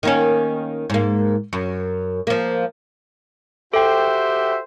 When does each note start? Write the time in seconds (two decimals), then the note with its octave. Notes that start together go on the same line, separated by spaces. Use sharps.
0.03 D#3 A#3 C#4
0.90 G#2 A#3
1.53 F#2
2.27 F3 A#3
3.74 F#4 G4 A4 C5 E5 G5